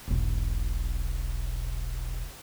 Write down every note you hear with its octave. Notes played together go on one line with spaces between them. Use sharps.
E1 B1